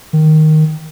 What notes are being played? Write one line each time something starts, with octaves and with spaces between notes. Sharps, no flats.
D#3